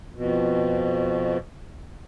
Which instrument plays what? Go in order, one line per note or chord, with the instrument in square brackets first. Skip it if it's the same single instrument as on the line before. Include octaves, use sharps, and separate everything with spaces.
[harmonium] F2 B2